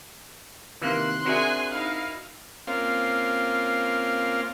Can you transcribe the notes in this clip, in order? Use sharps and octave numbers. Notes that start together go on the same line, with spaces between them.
C3 D#3 E3 A#3 C6 F#6
C4 D4 F#4 G#4 A#4 E5 G#5
D#4 E4 F5
A#3 C4 C#4 F4 F5